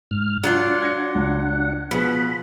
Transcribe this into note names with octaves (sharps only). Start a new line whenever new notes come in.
G#2 F6
F#3 D4 F4 D5 F#5
G#6 A#6 C#7
C#2
B2 F3 G#4 B5